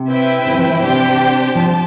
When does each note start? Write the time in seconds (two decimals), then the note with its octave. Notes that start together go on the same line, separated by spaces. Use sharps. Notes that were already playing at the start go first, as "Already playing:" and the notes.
Already playing: C3
0.09 C4 E4 B4 E5 G5
0.46 D3
0.52 E3
0.58 F3
0.70 E3
0.82 C3 D4 G4 C5 G5
1.55 F3 A5